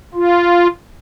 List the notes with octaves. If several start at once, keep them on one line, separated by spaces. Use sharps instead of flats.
F4